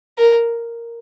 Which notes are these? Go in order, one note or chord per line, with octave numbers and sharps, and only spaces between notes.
A#4